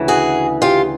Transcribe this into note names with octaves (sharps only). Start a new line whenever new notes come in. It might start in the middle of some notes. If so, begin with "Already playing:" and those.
Already playing: D2 C#3 E3
F#4 G#4
F4 G4